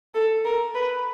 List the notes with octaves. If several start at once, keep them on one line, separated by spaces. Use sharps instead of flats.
A4
A#4
B4